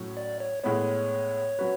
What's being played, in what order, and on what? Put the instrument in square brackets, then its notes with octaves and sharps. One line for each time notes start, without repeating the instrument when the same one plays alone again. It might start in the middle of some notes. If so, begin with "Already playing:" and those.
Already playing: [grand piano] A2 F#3 C#4
[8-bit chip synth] D5
C#5
[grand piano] A2 G#3 B3 [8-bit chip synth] C#5
[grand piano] F#3 C#4 F#4 B4